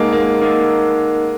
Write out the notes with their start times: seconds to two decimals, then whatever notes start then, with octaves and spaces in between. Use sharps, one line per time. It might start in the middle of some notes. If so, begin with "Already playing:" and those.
Already playing: G#3 A#3 D#4 A#4 D#5 F#5
0.13 A#3
0.41 A#3 D#4 A#4 D#5 F#5